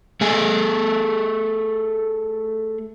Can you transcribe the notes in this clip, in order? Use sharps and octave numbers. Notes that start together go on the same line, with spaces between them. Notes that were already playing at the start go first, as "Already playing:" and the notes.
A3 G#4